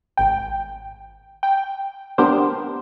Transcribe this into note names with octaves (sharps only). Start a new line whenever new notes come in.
G#1 G5
G5
B3 D4 G4 A#4 C5